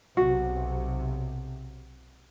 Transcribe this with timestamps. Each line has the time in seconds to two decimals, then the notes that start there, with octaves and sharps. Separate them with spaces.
0.17 B1 C3 F#4